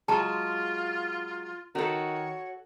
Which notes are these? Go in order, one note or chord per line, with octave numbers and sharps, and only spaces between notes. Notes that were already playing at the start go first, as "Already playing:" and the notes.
F#3 G#3 F4 G#4 A5 A#5
D#3 F#4 A4 C#5